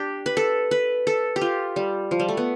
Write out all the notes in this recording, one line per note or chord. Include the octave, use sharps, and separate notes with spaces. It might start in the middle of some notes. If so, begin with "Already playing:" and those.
Already playing: D4 G4
B4
A4
B4
A4
G4
F4
G3
F3
G3
A3
B3